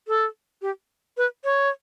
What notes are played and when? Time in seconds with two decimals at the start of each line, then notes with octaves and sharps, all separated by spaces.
0.08 A4
0.62 G4
1.17 B4
1.44 C#5